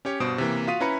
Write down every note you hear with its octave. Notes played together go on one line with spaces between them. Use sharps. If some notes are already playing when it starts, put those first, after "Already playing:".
C#4 G4 C#5
G2 B2 C5 D#6 D7
C3 E3 A#3
F4 F#4 F5 D#6 B6 D#7
C#4 E4 B4 A#5 B5 C#7